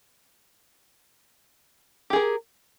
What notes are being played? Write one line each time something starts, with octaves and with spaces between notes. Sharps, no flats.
G4 G#4 A#4